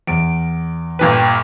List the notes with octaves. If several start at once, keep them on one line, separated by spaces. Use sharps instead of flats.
E2 D7
G1 A#2 B4 G5